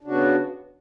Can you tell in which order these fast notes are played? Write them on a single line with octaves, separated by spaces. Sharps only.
D4 C#3 F#4 B3